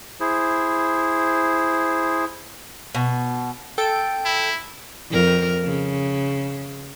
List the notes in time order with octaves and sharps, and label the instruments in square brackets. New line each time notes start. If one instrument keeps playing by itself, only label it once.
[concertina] E4 G#4 C5
[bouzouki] B2
[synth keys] A4 G5 D7
[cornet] E4
[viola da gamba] F2 A#4
C#3